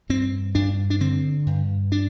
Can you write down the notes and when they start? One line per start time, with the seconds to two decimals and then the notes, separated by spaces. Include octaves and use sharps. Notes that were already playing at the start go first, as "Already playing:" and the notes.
0.09 G2 C4
0.55 G2 D4
0.90 D4
1.00 D3 C4
1.46 G2
1.92 D4